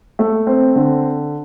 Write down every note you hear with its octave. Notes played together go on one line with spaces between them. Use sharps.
A3
C4
D3